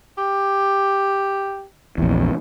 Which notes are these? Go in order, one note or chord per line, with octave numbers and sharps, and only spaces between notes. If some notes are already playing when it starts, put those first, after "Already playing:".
G4
A#1 E2